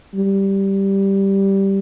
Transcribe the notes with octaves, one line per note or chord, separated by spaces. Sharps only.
G3